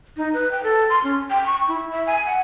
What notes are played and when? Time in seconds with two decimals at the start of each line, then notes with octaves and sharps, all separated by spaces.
0.17 D#4
0.34 B4
0.52 G5
0.64 A4
0.90 C6
1.04 C#4
1.30 G5
1.46 C#6
1.68 E4
1.91 E5
2.07 G#5
2.26 F#5